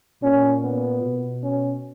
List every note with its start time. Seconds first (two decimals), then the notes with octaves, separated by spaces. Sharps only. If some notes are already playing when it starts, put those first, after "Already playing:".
0.22 A#2 C#4
0.63 B3
1.03 B2
1.43 C#4